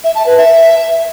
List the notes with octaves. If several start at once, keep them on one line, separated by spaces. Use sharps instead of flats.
E5
A5
B4
E5